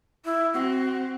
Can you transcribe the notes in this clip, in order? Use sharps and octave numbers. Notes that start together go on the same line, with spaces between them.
E4
C4 F#4